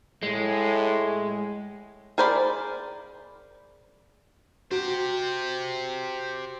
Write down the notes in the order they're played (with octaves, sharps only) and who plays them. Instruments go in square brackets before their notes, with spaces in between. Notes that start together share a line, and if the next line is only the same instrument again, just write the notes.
[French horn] A2 [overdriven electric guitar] G#3
[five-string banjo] G#4 A#4 C5 D5 B5
[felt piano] F#4 [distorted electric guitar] G4 C5